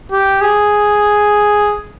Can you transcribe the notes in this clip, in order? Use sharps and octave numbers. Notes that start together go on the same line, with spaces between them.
G4
G#4